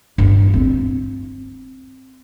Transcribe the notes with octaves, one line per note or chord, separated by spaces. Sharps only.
G2
C4